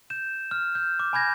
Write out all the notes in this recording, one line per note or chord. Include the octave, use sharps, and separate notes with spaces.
G6 E7
F6
G6
D6
G#5 B5 G6 G#6 A#6